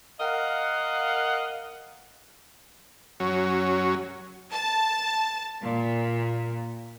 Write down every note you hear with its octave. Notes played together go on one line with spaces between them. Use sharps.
A#4 D#5 F5 F#5
F#2 F#3 C#4
A5
A#2